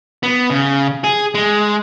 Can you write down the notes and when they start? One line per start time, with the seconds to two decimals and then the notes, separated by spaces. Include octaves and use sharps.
0.23 B3
0.50 C#3
1.04 G#4
1.35 G#3